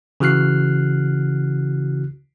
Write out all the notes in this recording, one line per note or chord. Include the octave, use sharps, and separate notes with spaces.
C#3 E3 F#4 F6 F#6 C7